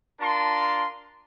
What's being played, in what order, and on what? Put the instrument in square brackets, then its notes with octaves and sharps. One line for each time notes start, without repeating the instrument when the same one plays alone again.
[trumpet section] D4 F4 A#4 A5 C6